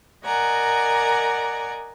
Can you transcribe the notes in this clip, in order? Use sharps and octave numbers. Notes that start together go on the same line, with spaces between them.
A#4 D5 D#5 F#5 G#5 A#5